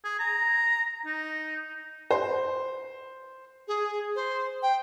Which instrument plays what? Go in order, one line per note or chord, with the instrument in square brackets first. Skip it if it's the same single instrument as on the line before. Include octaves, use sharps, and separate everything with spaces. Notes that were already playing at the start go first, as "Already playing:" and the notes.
[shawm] G#4
A#5
D#4
[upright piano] C5
[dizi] G#4
C5
G5